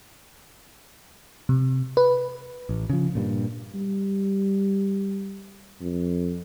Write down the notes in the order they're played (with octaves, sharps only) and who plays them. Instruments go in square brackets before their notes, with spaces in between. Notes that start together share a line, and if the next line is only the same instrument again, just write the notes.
[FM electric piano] C3
B4
[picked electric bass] A1
C#3 F3
G2 A#2
[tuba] G3
F2